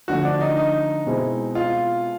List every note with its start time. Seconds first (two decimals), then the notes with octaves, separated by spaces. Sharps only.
0.08 D3 F3 A3 F#4
0.25 D4
0.40 D#4
0.57 D#4
1.06 B2 G#3 C4 E4
1.55 F4